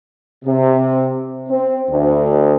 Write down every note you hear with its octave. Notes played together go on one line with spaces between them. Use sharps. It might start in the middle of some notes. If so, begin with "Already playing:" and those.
C3
C4
D2